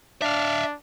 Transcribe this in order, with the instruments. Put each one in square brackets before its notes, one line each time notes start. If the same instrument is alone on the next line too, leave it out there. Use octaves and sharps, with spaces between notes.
[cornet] D4 [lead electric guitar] E5 F5